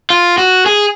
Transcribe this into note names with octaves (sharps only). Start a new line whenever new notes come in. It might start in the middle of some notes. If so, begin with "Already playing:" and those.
F4
F#4
G#4